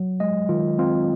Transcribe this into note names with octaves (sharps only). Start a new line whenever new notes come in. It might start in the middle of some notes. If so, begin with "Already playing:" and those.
Already playing: F#3
G#3 D#5
D#3 F4
C4 F4